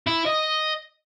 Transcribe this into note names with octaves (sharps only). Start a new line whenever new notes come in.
E4
D#5